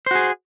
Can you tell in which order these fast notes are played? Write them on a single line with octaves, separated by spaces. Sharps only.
C5 F#4 G#4